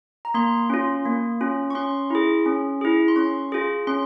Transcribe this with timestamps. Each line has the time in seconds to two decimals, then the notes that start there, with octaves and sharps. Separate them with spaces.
0.25 A#5
0.34 A#3 C6
0.70 C#4 F4
1.06 A#3
1.41 C#4 F4
1.70 C#6
1.75 C#4 C6
2.10 E4 G#4
2.46 C#4
2.81 E4 G#4
3.08 C6
3.16 C#4 C#6
3.52 F4 G#4
3.87 C#4 C6